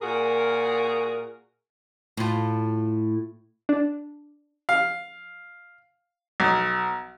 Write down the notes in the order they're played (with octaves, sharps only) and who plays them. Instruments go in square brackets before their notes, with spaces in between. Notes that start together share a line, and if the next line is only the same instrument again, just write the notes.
[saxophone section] A#2 F#4 G#4 A#4
[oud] A2 F4
[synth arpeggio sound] D4
[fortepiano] F5
B1